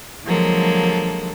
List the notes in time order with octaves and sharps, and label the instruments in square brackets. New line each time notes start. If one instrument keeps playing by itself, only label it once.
[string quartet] D3 F3 F#3 G#3 A#3 A4